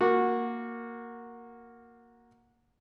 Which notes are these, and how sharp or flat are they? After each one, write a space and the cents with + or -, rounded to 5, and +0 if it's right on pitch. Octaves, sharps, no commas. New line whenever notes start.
A#3 +0 F#4 -15